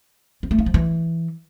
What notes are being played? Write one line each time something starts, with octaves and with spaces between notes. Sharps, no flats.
B3
A3
D#4
F3
E3